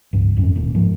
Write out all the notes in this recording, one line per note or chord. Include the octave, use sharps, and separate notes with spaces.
C#2 G2
D1 F2 C#4
D#1 A#2
G#2 F3